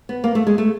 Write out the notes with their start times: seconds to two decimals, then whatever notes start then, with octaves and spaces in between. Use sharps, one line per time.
0.09 B3
0.24 A#3
0.35 A3
0.47 G#3
0.58 A3